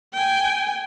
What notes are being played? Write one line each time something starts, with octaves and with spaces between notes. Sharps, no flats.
G5 G#5